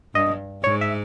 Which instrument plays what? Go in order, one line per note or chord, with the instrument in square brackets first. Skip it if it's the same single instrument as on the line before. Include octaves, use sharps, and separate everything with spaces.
[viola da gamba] G2 [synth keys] D#5
[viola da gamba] G#2 [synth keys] C#5
[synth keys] E5